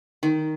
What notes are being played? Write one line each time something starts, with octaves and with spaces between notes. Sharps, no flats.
D#3